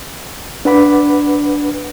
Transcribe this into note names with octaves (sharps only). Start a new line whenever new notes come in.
D4 B4 F#5 B5 D6